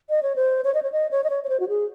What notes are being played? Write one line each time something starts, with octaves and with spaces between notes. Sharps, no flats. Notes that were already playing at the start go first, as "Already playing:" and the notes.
D#5
C#5
C5
C#5
D#5
C#5
D#5
C#5
D#5
C#5
C#5
C5
F#4
G#4